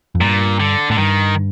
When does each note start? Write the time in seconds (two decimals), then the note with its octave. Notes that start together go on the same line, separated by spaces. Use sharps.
0.15 F2
0.20 G2 A#2
0.60 D3
0.90 A2 D3
0.98 G2 D#3